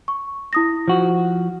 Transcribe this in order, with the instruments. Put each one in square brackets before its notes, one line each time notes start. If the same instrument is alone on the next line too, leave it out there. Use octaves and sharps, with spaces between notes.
[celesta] C#6
E4 D#6 A#6
[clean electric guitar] F3 F#4